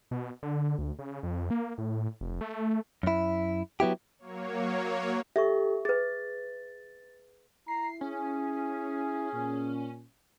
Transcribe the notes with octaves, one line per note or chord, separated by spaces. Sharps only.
B2
D3
D2
C#3
F2
A#3
A2
F1
A3
F#2 E4
F#3 B3 E4 G4
F#3 A#3 C#5
G4 A4 E5 C#6
G#4 B4 A6
E4 A#5 C7
C#4 G#4
A#2